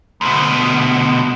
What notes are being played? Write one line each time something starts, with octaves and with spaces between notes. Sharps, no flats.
D2 B2